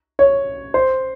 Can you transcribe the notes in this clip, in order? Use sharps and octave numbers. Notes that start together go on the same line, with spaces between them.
C#5
C5